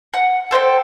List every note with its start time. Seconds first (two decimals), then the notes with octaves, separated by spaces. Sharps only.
0.14 F#5
0.51 A4 C5 D#5 G5